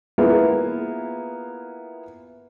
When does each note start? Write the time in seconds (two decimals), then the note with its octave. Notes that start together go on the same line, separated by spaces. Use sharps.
0.18 A#3 B3 E4 F4 G#4